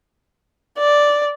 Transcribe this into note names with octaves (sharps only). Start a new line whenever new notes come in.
D5